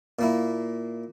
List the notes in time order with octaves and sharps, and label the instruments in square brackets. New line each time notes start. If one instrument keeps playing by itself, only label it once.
[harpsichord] A#2 A#3 E4